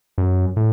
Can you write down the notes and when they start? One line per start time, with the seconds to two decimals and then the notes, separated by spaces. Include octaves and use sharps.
0.18 F#2
0.56 A2